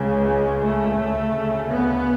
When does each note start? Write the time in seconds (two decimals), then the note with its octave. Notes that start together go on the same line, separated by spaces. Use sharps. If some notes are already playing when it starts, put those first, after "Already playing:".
Already playing: C#2 C#3
0.23 G#3
0.60 A3
0.97 D2 C#3
1.70 B3